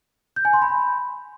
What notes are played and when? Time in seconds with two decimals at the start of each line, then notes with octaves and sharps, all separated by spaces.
0.36 G6
0.45 G#5
0.53 C6
0.62 B5